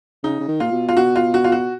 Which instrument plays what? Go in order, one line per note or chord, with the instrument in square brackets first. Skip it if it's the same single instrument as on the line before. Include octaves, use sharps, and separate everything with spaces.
[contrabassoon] C#3 [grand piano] D#4
[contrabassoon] C#3
D#3
[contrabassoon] A#2 [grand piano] F4
[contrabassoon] B2
[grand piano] F4
[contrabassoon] B2 [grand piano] F#4
[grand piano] F4
F#4
F4
F#4